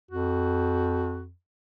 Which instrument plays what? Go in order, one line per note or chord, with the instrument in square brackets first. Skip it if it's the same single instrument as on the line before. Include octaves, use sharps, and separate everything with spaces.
[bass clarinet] F2 [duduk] F#4